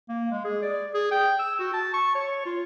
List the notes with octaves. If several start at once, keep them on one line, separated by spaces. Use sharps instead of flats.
A#3
G#3
G#4
D5
G#4
G5
E6
F#4
A5
C#6
C#5
F4